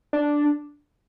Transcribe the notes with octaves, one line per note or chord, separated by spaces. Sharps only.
D4